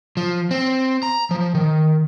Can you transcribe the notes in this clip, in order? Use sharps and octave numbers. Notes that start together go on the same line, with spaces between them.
F3
C4
A#5
F3
D#3